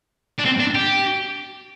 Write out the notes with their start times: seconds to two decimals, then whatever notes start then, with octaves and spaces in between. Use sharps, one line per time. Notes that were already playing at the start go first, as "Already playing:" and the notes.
0.39 D4
0.45 C4
0.59 D4
0.75 G4